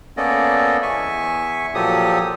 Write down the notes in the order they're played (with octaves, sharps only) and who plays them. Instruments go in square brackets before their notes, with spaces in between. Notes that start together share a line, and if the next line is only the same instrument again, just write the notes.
[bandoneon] A#3 B3 C#4 A4 D5 D#5
E2 E5 G#5 C#6
A#2 F3 F#3 G4 A4 D#6